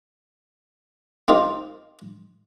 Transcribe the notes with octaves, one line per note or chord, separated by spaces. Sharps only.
A#3 C4 D#4 F4 G4